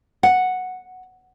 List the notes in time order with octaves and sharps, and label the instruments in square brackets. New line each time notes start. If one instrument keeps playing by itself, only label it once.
[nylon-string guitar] F#5